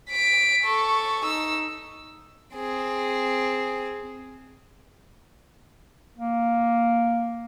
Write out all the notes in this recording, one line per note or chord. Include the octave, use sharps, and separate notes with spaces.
B6 D7
A4 C#6
D#4 E6
C4 G#4
A#3